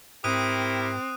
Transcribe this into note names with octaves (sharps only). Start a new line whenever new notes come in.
G#2 C4 E4 G4 A#4 D#6 F#6 D#7